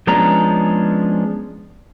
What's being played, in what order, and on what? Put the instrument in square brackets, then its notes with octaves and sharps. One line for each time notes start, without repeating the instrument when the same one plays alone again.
[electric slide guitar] F3 G#3 B3 C#4 D4 A#5